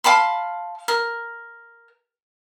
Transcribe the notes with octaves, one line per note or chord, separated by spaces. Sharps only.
F5 A5 B5 C6
A#4